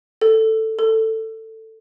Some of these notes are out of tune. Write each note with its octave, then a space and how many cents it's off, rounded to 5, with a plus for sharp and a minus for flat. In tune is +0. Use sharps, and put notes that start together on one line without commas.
A4 +10
A4 +15